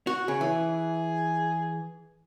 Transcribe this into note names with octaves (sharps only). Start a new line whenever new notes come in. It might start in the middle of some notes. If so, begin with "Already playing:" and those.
F#4
C#3 G#4
E3